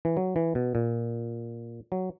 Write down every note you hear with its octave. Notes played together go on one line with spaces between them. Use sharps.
E3
F#3
E3
B2
A#2
F#3